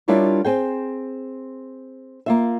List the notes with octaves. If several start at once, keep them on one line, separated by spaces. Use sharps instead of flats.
G3 D4 E4 F4 A#4 C#5
C4 G#4 G5
A#3 F4 E5